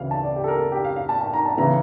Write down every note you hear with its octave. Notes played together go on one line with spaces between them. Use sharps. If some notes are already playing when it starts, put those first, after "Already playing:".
Already playing: D2 C#3 E3 F5
A5
D5
G4
A4
A#4
A4
G4
F5
F5
A5
A5
A#5
A5
C#3 E3 A#5